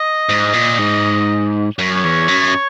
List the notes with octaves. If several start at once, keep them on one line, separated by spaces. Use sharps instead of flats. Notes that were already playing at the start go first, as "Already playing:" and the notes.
Already playing: D#5
G#2
A#2
G#2
F#2 C#5
E2
F#2